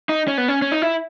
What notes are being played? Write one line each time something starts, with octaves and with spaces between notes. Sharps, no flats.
D#4
C#4
B3
C#4
C#4
D#4
E4